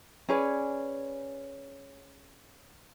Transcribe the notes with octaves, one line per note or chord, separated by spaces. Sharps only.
C#4 G#4 B4 D5